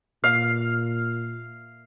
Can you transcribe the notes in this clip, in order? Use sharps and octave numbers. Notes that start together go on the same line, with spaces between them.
A#2 F5